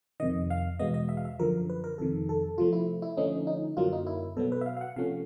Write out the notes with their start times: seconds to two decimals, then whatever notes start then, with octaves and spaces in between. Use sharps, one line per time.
0.20 F2 C3 D#3 D#5
0.50 F5
0.79 E2 B2 G#3 B3 D#5
0.94 D#5
1.09 E5
1.17 F5
1.25 E5
1.39 F#2 D3 F3 A#4
1.69 B4
1.84 A#4
1.98 F2 C3 D#3 A4
2.29 A4
2.58 C3 F3 A3 F4
2.72 E4
3.02 E4
3.17 D3 F3 A3 C#4 D#4
3.47 D#4
3.77 F#2 D3 F#3 A#3 F4
3.92 D#4
4.07 E4
4.37 B2 F#3 B3 A4
4.52 B4
4.61 E5
4.66 F5
4.77 F5
4.81 F#5
4.96 C3 F3 A3 C#4 F5